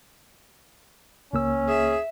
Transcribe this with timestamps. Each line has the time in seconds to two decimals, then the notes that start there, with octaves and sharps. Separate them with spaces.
1.33 C#2 A#3 C#4 E6
1.68 G#4 E5